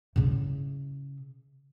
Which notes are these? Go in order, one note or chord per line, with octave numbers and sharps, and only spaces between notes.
C#3 E4